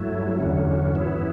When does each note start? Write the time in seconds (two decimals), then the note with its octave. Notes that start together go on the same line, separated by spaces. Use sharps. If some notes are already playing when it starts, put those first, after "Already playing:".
Already playing: G2 F#3 A3 E4
0.38 E2 D3 F#3 C#4
0.95 G2 E3 B3 E4